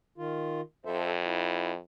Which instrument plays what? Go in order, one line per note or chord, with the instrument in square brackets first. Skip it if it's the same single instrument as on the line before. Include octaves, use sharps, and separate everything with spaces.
[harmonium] D#3 F4
[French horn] F2 [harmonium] A4 C5 E5
[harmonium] E4